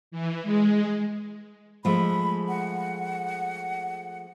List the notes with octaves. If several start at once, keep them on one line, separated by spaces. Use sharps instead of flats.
E3
G#3
F3 G#3 A3 B5
F#5